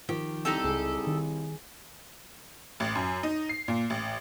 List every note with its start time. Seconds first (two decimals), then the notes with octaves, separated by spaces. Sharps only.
0.09 D#3 F3 G4
0.45 C2 D#4 G4 A4
0.64 C#2 G#4
1.07 D#3
2.80 A1
2.95 F#2
3.23 D#4
3.49 C7
3.68 A#2
3.90 A1